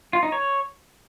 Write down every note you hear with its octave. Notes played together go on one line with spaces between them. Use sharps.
F4
D#4
C#5